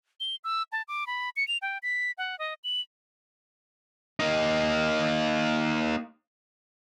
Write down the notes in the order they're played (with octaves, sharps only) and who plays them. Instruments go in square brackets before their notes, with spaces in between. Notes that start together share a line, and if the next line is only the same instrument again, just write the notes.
[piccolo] G7
E6
A5
D6
B5
C#7
F7
G5
B6
F#5
D#5
F#7
[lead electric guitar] A#3 D#4